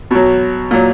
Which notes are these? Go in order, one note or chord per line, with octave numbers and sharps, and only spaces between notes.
B2 F#3
A#2 F#3